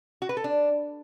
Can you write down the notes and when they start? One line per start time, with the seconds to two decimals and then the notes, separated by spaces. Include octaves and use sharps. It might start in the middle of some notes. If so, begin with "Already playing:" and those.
0.22 F#4
0.29 B4
0.37 A4
0.44 D4